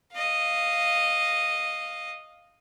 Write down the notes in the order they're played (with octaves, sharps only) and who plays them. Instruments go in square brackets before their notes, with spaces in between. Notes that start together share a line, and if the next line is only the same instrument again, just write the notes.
[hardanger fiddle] D#5 F5